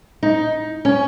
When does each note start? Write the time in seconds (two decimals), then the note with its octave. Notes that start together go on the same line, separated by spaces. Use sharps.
0.23 D#4
0.85 C#4